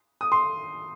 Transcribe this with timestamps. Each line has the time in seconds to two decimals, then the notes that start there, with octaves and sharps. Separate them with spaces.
0.21 D#6
0.32 C6